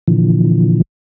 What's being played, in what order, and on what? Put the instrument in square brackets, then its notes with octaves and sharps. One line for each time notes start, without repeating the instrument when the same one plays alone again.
[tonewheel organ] A#2 D3 E3 F3